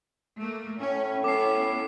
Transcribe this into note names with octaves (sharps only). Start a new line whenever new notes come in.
A3 A#3
A2 C#4
B3 C#4 E4 A4 D6 C7